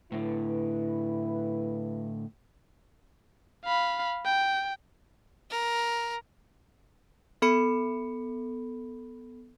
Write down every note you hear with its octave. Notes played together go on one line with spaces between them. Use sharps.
A2 D3 E4 B4
F5 B5
G5
A#4
B3 A4 B5 C#7